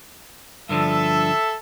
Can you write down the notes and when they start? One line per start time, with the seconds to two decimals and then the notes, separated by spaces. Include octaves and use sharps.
0.69 G2 D3 F3 A4 E5